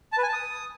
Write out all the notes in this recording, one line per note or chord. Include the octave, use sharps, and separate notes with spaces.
A5
B4
G#5
A5
D#6